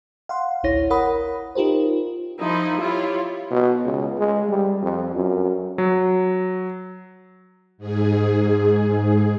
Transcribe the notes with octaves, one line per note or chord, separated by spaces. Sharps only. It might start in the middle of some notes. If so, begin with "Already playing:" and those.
F5 F#5 C6
A1 D2 E4 C#5 A#6
A#4 C#5 F#5 B5 D#6
D#4 F4 G4 A#4 C5
F3 D#4 E4
E4 F4 G4 C#5
B2
C#2
G#3
G3
F2
F#2
F#3
G#2 G#4